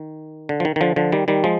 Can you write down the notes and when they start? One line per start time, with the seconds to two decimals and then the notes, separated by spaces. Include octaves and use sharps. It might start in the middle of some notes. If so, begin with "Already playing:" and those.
Already playing: D#3
0.49 D3
0.60 F3
0.65 D#3
0.76 D#3
0.81 D3 F3
0.96 D3 F3
1.12 D#3 G3
1.28 D#3 G3
1.44 F3 G#3